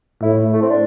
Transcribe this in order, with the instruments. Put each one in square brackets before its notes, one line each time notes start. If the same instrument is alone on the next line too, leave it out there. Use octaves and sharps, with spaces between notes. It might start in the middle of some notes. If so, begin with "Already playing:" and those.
[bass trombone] A2 [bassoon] E4
[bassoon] A3
C4
D4